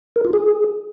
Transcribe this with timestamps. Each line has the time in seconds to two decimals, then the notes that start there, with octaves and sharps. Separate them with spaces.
0.16 A#4
0.25 F4
0.33 G#4